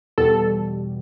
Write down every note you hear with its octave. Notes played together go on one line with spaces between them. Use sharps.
E2 B2 G3 A4